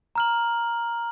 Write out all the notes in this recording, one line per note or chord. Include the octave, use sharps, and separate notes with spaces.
A#5 F6 F#7